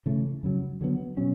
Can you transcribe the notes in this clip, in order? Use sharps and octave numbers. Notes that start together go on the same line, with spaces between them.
C#3 E3 A3
F#2 C#3 F#3
D3 F#3 B3
B2 F#3 C#4